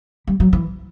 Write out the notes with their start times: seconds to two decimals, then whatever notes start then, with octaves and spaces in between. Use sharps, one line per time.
0.27 G3
0.40 F#3
0.53 E3